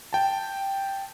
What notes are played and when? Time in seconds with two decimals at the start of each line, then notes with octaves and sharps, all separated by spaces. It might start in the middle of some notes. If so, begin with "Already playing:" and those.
0.13 G5 A5